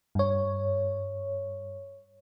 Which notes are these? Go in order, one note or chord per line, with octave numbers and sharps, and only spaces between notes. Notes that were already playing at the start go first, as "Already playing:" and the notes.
G2 C#5